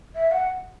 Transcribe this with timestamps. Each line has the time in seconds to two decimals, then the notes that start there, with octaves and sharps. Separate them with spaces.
0.15 E5
0.31 F#5